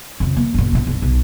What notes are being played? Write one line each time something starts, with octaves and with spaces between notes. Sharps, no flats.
F2 C#3
A#3
F#1 A#2
A1 B2
B1
B1